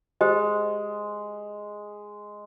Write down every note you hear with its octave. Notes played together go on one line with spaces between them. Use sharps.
G#3 G4 C5 D#5